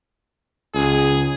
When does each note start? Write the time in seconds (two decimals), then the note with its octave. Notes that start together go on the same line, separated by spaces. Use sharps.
0.74 C#2 G#4